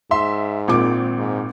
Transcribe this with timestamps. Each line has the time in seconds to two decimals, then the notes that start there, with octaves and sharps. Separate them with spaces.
0.11 G#2 E5 C6
0.68 G#1 A#2 C4 D6
1.18 G#2